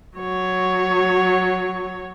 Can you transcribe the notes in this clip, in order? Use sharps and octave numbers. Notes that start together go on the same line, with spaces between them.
F#3 C#5